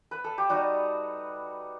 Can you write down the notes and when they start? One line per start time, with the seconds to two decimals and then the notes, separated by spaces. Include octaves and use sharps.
0.11 B4
0.24 A4
0.38 G4
0.49 G3 D#4 F#4